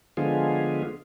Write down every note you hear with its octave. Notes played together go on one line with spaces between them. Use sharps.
D3 F3 G#3 B3 F4 G#4